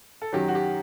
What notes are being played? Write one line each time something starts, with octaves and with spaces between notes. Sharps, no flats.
A4
F#2 D#3 F#3 G4
F#4
G4